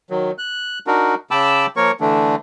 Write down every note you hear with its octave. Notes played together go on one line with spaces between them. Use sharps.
D#3 F#3
F#6
D4 D#4 F#4 A#4
C#3 G5 A5 B5 D6 E6
F3 A#3 A#4 C#5 C#6
D3 E3 A3 D4